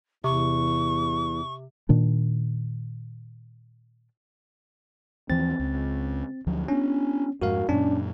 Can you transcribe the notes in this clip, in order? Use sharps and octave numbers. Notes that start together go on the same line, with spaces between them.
E2 C3 C#6
A#2 D#3 D4
D#2 E3 F3 C4 A6
C#2
D2 F3 F#3
B3 C#4 D4
F2 G#2 F#4 A#4 F5
F#2 A#2 C#4 D4